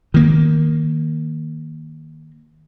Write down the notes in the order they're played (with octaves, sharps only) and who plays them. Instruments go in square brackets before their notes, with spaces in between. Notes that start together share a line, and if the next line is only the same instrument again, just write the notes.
[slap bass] D#3 A#3